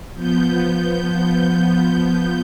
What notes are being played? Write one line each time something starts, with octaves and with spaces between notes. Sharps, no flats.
F3 B3 G6